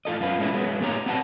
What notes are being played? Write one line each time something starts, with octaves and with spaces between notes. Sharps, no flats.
A2 F4 A4 D#5
F#2 F4 B4
G#3 A3 C#4 E4 B4
F#3 G#3 B3
A2 A#3 B3 G4 C#5 A#5
B3 C4 B4 F#5 A5